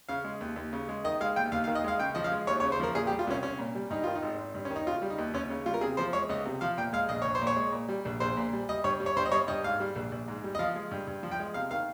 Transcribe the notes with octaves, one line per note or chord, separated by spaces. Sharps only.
C#3 F5
G#3
D#2
D#2
C#3
G#3
D#3 D#5
G#3 F5
D#2 G5
D#2 F5
F5
D#3
D#5
G#3 F5
C#3 G5
F3 D#5
F5
G#3
D#2 C#5
C#5
C#3
C5
F3 A#4
A#2 G#4
G4
G3
F4
C2 C#4
C2 C#4
A#2
G3
G2 D#4
D#3 F4
D#4
G#1
G#1
G2
C#4
D#3
D#4
C#3 F4
G3
D#4
D#2
D#2 C#4
C#3
G3 F4
A#4
C3 G#4
F3 C5
G#3 C#5
C#2 D#5
C3
F3 F5
A#2 G5
G#3 F5
A#1 D#5
A#1 C#5
C5
A#2
C#5
G#3
A#2
G3
A#1
A#1 C5
A#2
G3
G3 D#5
G2 C#5
G3
C#5
G2 C5
D#5
G3 C#5
G2 D#5
G#2 F5
G3
A#1
A#1
G#2
G3
D#5
F3 F5
G#3
G2
G2
F3
G5
G#3
C3 F5
D#3 F5